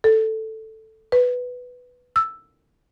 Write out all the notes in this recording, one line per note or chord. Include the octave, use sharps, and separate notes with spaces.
A4
B4
E6